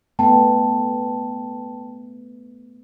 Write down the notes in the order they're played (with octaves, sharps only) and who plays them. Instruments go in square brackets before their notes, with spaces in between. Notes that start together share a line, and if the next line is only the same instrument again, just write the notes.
[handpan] A3 B3 [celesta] G5 A5